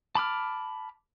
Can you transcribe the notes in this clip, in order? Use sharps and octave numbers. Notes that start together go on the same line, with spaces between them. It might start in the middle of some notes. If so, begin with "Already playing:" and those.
A5 B5 D6 F6